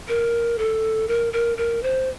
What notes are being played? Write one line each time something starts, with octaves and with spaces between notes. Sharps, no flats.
A#4
A4
A#4
A#4
A#4
C5